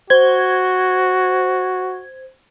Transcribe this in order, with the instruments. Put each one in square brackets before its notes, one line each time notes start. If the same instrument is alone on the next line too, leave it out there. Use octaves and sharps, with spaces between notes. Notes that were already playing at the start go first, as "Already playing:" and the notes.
[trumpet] F#4 [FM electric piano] C5 G#6